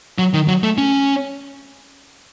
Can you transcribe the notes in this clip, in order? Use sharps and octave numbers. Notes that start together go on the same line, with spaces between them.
F#3
D#3
F#3
A3
C#4